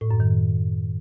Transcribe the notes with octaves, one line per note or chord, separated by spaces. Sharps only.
A2
F#2
D#3